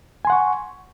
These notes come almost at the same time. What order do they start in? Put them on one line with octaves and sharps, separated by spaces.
G#5 C6 F#5 C#6